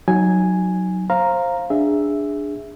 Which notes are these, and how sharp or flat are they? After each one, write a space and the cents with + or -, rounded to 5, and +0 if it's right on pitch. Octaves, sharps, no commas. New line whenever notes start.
F#3 +0 D#4 +0 G#5 +0
C5 +20 F5 +0 A#5 +0
D4 +0 G#4 -10 E5 +0